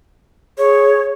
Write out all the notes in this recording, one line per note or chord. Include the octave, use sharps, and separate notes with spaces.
G#4 C#5